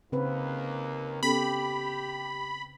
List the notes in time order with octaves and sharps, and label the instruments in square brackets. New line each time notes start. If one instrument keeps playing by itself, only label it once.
[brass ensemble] D#2 A#3 [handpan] C#3 C4 B4
[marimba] B3 C#4 A4 [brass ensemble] G4 [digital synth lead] B5